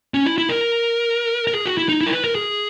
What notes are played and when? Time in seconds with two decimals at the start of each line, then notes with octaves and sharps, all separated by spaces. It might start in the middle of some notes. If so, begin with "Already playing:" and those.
0.14 C#4
0.26 E4
0.38 E4
0.49 A#4
1.47 A#4
1.55 G#4
1.66 F#4
1.78 E4
1.89 D#4
2.01 E4
2.06 A#4
2.13 B4
2.24 A#4
2.35 G#4